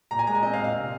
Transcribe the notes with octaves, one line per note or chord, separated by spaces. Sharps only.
A#2 A#5
G#5
G#3 A#5
G#5
C4 D#5
F5
A#2
F5
C3